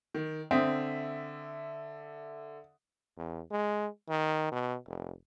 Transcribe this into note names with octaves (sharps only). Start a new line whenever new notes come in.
D#3
D3 C4 E5 D#6
E2
G#3
D#3
B2
F1